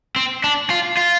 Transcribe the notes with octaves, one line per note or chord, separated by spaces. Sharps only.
C4
D4
F4
F4